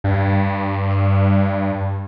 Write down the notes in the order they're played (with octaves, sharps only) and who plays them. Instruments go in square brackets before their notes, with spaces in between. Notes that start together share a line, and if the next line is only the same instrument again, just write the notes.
[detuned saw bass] G2